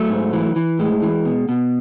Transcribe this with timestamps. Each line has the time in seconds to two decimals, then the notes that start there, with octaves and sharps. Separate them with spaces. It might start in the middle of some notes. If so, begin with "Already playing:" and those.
Already playing: F#3 A3
0.10 G#2
0.33 E3
0.56 E3
0.79 A2 G#3
1.03 E3
1.25 B2
1.49 B2